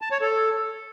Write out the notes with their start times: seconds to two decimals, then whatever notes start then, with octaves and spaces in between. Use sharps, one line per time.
0.02 A5
0.12 C#5
0.21 A4